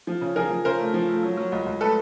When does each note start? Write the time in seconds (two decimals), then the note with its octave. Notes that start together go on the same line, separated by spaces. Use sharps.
0.07 F3
0.21 C#3
0.36 F3 G#4 A#4
0.50 F3
0.65 C#3 A#4 C5
0.80 A3
0.94 F3
1.09 A3
1.23 F#3
1.37 F#3
1.52 C#2
1.66 C#2
1.80 A3 A4 B4